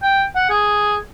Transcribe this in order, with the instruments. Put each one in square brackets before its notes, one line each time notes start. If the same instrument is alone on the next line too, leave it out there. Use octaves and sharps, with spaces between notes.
[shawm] G5
F#5
G#4